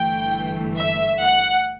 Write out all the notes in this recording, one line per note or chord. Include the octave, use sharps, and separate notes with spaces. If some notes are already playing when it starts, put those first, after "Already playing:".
Already playing: G1 G2 E3 A3 G5
E5
F#5